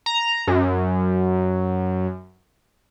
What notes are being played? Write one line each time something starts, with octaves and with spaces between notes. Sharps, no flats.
A#5
F#2